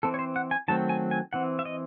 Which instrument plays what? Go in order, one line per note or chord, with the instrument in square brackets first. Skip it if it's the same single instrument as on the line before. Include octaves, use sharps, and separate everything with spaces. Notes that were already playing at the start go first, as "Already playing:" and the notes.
[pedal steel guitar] E3 C4 A4
C#5
C5
F#5
G#5
D#3 F#3 A3 C4 A5
G#5
G#5
E3 C4 F#5
E5
D#5